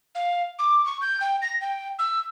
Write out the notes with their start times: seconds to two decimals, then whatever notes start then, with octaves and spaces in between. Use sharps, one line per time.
0.15 F5
0.59 D6
0.85 C#6
1.02 G6
1.21 G5
1.42 A#6
1.61 G5
1.99 E6